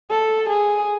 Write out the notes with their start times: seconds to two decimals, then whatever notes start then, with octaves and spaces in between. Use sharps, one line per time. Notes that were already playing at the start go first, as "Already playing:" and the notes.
0.10 A4
0.49 G#4